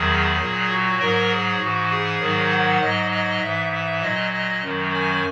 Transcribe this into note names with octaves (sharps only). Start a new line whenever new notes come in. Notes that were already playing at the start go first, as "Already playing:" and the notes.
Already playing: E2 D#3 F#3 G#4
A#2 F#3
F#4
G#2 F#3 A#4
G#4
G#2 E3 F#4
G#4
G#2 D#3 F#3
F#5
G#2 F#3 D#5
D#5
G#2 E3 E5
E5
A#2 F#3 D#5
D#5
F#2 D#3 F#3
G#5